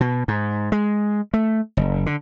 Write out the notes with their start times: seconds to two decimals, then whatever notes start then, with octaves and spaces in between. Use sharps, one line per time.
0.01 B2
0.28 G#2
0.72 G#3
1.34 A3
1.77 F#1
2.06 D3